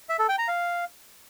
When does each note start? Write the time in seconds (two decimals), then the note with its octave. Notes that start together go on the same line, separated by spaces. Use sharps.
0.09 E5
0.19 A4
0.29 G5
0.38 A#5
0.48 F5